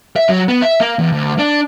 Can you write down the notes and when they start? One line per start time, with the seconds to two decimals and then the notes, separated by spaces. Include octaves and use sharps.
0.16 E5
0.29 F#3
0.48 B3
0.62 E5
0.80 A#3
0.99 E2
1.13 D2
1.39 D4